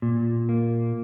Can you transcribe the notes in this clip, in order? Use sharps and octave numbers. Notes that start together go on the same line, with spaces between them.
A#2
A#3